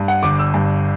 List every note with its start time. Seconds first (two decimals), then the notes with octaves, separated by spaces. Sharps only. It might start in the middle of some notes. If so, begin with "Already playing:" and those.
Already playing: G2
0.08 F#5
0.23 G1 D6
0.39 E6
0.54 G2